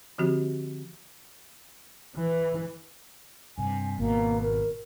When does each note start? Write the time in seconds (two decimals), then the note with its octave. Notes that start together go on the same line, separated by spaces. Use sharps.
0.18 D3 F3 C4 F#4 G4
2.16 E3
3.58 G2 C3 G#5
3.98 G#1 B2 A#3
4.42 A#4